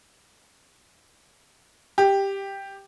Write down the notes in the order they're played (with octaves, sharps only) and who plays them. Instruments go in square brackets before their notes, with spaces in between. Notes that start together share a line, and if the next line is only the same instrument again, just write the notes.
[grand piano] G4